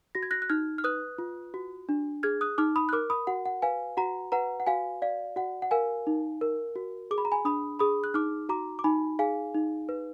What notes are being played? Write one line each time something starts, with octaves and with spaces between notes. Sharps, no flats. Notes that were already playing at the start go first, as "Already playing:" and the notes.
F#4 A#6
G#6
F#6 A#6
F#6
D#4 F6 G#6
F6
B4 D#6 F#6
F4
F#4
D4
G#4 F6 G#6
D#6 F#6
D#4 D6 F6
B5 D#6
F#6
A#4 D6 F6
B5 D#6
F#4 F#5
F#5
B4 F5 G#5
F#4 F#5 A#5
B4 F#5 A#5
F#5
F#4 F5 G#5
D5 F5
F#4 F#5
F#5
A#4 F5 G#5
D#4
A#4
F#4
G#4 D6
B5
A#5
G#5 B5
D4 B5 D#6
G#4 B5 D#6
F#6
D#4 D6 F6
F#4 A#5 D6
D6
D#4 G#5 B5
G#4 F5 G#5
D#4
B4